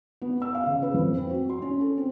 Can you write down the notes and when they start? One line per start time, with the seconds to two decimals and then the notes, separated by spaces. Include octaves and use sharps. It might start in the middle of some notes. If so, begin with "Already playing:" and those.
0.22 B3
0.42 E6
0.55 F5
0.66 C#3
0.83 B4
0.94 F2
1.18 C4
1.30 F#4
1.50 C6
1.62 C#4
1.81 A4
1.97 C4